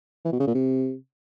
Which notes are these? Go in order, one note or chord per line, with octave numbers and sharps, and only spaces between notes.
E3
B2
C#3
A#2
C3